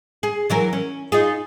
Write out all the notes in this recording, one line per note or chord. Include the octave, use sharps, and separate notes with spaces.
G#4
E3 F#3 A#4
C#4
D#4 F4 G#4